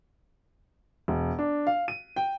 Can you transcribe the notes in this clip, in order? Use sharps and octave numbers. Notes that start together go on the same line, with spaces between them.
E1
D4
F5
D#7
G5